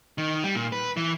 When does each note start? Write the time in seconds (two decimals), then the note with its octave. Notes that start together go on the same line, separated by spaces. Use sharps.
0.18 D#3
0.44 G3
0.55 A#2
0.72 B4
0.97 E3